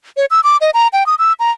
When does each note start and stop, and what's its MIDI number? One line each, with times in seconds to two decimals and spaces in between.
0.17 0.25 73
0.31 0.40 88
0.44 0.57 86
0.61 0.71 75
0.74 0.88 82
0.93 1.06 79
1.06 1.15 87
1.19 1.33 88
1.40 1.51 82